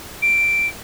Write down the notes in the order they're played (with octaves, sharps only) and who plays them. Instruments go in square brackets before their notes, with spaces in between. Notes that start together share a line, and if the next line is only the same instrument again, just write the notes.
[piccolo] D7